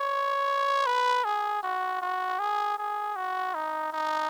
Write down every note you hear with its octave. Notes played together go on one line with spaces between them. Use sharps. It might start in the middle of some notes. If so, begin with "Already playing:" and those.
Already playing: C#5
B4
G#4
F#4
F#4
G#4
G#4
F#4
D#4
D#4